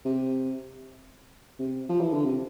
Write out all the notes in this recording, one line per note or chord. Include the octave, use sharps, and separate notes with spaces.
C3
C3
F3
E3
D3
C3